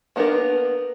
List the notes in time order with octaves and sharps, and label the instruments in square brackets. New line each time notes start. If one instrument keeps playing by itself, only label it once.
[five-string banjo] A#3 B3 D4 G4 A#4